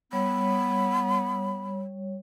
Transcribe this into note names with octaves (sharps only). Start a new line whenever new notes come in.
G3 B3 C#5 B5